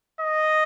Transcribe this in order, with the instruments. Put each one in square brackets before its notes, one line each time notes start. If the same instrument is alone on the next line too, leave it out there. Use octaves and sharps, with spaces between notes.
[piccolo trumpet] D#5